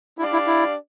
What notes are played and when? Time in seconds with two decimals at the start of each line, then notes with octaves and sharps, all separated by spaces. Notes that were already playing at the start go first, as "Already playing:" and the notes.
0.18 D4 E4 G4 D5 F5
0.33 E4
0.47 E4